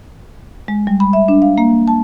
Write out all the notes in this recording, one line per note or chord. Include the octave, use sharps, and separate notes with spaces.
G#3
G3
B5
E5
D4
F5
A#3
A5